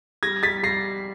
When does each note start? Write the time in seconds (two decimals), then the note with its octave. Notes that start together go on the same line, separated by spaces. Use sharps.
0.23 G3 G#6 A#6
0.43 G3 A6 B6
0.63 G3 A#6 C7